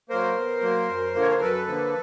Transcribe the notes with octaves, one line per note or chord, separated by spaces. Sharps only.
F#3 A#3 A#4 C5
B2
F#3 A#3
F#2
D3 F3 A#3
C#5
C5
F#2 A4 B4
D3 F3 A#3